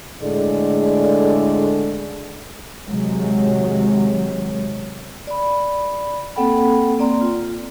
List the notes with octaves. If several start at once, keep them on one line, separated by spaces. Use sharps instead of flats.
A2 D3 G#3 A3 G#4 D5
C3 D#3 F#3 G#3
D5 B5
A#3 C4 A4 F#5 G5 B5
A#3 C4 D5 A#5 C6
F4